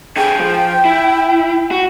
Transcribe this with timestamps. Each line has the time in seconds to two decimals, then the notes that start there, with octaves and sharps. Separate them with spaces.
0.17 D3 G#4 G5
0.40 F3
0.85 E4
1.71 F#4